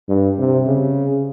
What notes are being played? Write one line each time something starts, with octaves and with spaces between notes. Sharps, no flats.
G2
C3
C#3